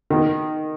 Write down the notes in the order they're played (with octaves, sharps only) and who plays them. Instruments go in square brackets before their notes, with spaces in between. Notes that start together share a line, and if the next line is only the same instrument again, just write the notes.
[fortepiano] D#3